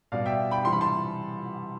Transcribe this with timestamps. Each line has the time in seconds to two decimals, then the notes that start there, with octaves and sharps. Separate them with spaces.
0.12 B2 G3 D5 F5
0.26 E5 G5
0.51 G5 B5
0.64 C3 E3 G3 C6
0.72 B5
0.81 A5 C6